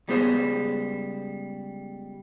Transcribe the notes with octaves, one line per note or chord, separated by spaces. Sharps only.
C#2 G3 B3 G#4 C5 B5